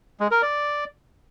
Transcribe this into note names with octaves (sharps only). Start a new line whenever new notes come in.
G#3
A#4
D5